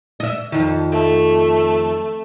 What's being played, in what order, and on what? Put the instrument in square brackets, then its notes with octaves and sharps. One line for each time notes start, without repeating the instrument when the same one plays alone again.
[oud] D#5 E5
F2 D#3
[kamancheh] A3